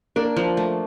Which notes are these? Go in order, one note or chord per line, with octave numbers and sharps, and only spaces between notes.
A#3 D4
F3
A3